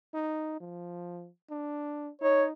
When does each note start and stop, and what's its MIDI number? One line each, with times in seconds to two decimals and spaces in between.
0.14 0.57 63
0.61 1.29 53
1.51 2.10 62
2.22 2.52 63
2.22 2.44 73